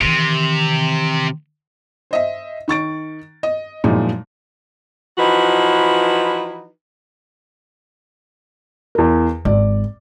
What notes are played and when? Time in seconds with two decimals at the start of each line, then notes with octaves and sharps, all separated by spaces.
0.01 C3 D#3 E3
2.11 C5 D#5 E5
2.68 D#3 C#6 A6 D7
3.43 D#5
3.84 F#2 A#2 F3 G#3 D#4 E4
5.18 E3 F3 D#4 E4 F#4 B4
8.95 E2 A#4
9.45 G#1 D5